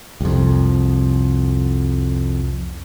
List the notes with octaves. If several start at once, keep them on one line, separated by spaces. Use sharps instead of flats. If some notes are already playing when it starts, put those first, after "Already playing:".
C2 F2